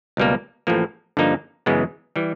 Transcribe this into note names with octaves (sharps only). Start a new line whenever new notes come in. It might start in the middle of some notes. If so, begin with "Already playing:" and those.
C#2 B2 G3 A#3
A1 A2 F3 A#3
G2 D3 F3 A#3 D#4
F#2 C#3 E3 G#3 B3
E3 G3